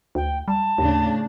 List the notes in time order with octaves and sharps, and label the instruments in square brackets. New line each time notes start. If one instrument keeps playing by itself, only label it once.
[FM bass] D2 [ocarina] G5
[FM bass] G3 [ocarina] A5
[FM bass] D#2 [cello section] A2 C#3 D4